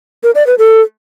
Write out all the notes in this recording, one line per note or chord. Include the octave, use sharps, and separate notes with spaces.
A#4
D5
B4
A4